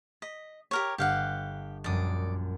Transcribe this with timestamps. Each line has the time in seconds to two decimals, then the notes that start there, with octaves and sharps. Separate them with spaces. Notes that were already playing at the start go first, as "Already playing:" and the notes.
0.22 D#5 B6
0.71 G4 A#4 C#5
0.98 G1 G4 F5 F#5
1.84 A#1 F#2 G3 D5 D#6